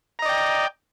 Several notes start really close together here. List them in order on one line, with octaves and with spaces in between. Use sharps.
A#5 D#5 D5 G5